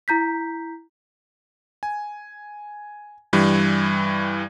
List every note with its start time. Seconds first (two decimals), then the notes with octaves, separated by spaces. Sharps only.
0.08 E4 A#5 G6 B6
1.83 G#5
3.33 G2 E3 G3